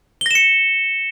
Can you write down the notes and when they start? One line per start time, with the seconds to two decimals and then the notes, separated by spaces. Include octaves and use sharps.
0.21 G7
0.26 A#6
0.31 E7
0.35 C#7